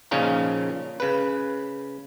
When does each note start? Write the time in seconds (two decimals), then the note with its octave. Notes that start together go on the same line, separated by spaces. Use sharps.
0.11 A#2 C#3 F3 C#4 D#4 F4
1.00 C#3 B4